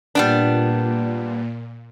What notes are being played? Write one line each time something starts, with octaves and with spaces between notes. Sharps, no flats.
A#2 G3 B3 D4